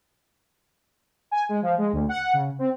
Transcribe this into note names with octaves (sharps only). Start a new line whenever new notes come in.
G#5
G#3
F3
G#3
D2
F#5
C#3
C4